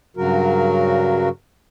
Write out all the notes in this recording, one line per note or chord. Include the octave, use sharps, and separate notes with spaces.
G2 C#3 F#3 F#4 A#4